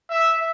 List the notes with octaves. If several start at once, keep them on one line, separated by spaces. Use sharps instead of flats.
E5